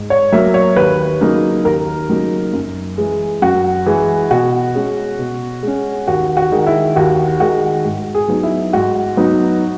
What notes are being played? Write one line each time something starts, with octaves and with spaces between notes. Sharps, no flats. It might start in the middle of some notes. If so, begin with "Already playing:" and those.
Already playing: G#2
C#5
F#3 A#3 E5
C#5
D#2 B4
C#3 F#3 A#3 D#4
D#2 A#4
C#3 F#3 A#3 D#4
F#2
E3 G#3
F#2 F#4
E3 G#3
B2 F#4
G#3 C#4
B2
G#3 C#4
D#2 F#4
F#4
D#3 G#3
E4
D#2 F#4
D#3 G#3 F#4
G#2
G#4
F#3 B3 D#4
E4
G#2 F#4
F#3 B3 D#4